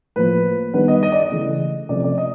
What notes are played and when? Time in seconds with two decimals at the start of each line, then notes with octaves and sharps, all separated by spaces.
0.16 A2 F3 A#3 B4
0.73 D#3 G3 B3 D4 B4
0.88 D#5
1.03 D#5
1.12 D5
1.22 D#5
1.31 C#3 E3 A3
1.89 C3 F3 A3 C#4 D5
2.04 D5
2.18 D#5